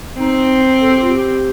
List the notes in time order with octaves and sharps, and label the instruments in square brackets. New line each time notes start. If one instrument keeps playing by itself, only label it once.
[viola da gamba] C4 [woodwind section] D#4
[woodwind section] A4
G4
F4
G4